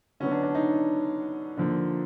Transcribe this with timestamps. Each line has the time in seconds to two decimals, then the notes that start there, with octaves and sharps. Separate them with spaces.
0.20 D3 F#3 B3 C#4
0.32 D4
0.43 D4
0.55 D#4
1.57 D3 F3 A#3